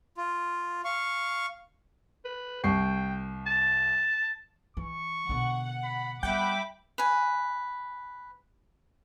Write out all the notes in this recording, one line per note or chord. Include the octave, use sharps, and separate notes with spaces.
F4
F5 C#6
B4
C2 G5 C#6 C7
A5
E3 C#6
B2 D3 F#5
B5
G3 B3 E5 F#5 G5 B5 D6
B4 G#5